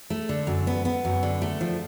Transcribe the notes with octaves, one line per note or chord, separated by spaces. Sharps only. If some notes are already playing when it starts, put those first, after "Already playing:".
A3
D3
F#2
B3
B3
F#2
D3
A3
F3